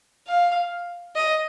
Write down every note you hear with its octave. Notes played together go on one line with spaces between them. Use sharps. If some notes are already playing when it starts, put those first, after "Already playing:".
F5
D#5